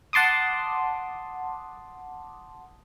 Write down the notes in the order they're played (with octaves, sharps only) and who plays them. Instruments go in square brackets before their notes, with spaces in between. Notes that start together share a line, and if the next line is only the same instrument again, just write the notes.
[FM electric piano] F#5 A5 C6 D6 D#6